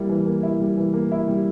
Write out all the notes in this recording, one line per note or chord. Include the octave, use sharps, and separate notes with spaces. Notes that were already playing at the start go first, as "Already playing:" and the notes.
Already playing: G3 A#3 E4
E3
A#3
E4
G3
E3
A#3
E4
G3